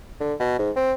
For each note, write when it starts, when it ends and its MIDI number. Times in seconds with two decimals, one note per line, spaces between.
0.20 0.34 50
0.40 0.58 47
0.59 0.71 44
0.76 0.93 60